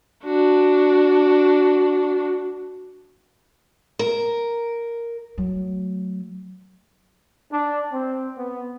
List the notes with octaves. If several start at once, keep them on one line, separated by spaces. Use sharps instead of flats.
D4 F#4
A#4
F#3 A3
D4
C4
B3